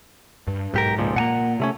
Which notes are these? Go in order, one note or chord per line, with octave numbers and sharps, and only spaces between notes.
G2
B1 G#2 G4 A#4
C#2 A#2 F3
A#2 A#3 F#5 G#5 A#5
C3 A3 C#4